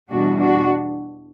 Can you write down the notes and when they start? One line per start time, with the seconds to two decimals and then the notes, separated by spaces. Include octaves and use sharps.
0.11 E2 B2 G3 D4 F#4
0.39 D4 F#4